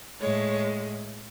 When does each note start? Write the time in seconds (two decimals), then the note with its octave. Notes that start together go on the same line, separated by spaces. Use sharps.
0.20 A2 G#3 C#5